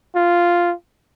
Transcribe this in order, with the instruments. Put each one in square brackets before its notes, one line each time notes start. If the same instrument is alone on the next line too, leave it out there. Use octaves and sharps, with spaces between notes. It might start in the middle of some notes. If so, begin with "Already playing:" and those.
[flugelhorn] F4